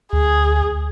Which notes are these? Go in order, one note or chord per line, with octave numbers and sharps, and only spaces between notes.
D2 G#4